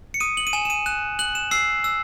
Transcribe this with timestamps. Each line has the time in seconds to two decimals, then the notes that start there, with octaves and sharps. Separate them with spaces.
0.14 C#7
0.20 D#6 D#7
0.37 F#7
0.47 D#7
0.53 G#5 E7
0.65 E7
0.70 D#7
0.86 F#6 E7
1.19 F#6 F#7
1.35 E7
1.51 E6 C7
1.84 E6